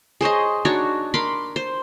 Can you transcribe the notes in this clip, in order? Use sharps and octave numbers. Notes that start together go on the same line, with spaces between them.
G#4 C5 C#5 D#5
D4 D#4 F#4 C#5
A#4 B5 C6 D6
C5